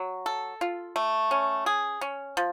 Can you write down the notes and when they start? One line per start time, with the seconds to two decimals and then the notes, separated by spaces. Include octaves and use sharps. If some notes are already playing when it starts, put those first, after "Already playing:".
Already playing: F#3
0.26 A4
0.61 F4
0.96 A3
1.31 C#4
1.66 G#4
2.01 C#4
2.37 F3